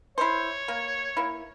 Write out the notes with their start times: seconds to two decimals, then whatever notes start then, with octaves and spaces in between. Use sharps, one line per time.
0.18 E4 C5 C#5
0.68 A#3
1.17 A#3 E4